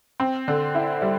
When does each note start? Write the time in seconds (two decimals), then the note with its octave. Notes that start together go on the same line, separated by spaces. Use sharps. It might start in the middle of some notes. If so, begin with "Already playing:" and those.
0.20 C4
0.48 D3
0.75 E4
1.02 G3